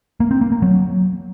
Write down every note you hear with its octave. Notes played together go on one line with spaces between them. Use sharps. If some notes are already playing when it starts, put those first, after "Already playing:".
A#3
C4
A#3
A#3
F#3